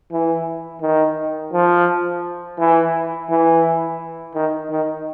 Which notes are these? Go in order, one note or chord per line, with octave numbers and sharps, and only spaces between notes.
E3
D#3
F3
E3
E3
D#3
D#3